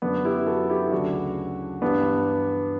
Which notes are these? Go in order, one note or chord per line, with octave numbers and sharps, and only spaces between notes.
F#2 D3 F#3 B3 D4
E4 G4
F#4 A4
E4 G4
D2 C#3 F#3 D4 F#4
G2 E3 G3 B3 D4